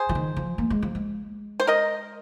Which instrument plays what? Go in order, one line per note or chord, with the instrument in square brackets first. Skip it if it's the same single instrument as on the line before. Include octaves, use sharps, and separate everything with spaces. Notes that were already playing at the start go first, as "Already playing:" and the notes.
Already playing: [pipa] G#4 C5
[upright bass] F3
D#3
F3
A#3
G#3
F3
G#3
[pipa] C5
A#4 D#5